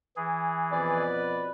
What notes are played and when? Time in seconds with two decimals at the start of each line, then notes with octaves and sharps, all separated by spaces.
0.17 E3 G#4
0.72 F2 B2 B4 D5